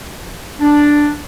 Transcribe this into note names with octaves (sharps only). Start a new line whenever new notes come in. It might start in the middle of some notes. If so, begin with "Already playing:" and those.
D4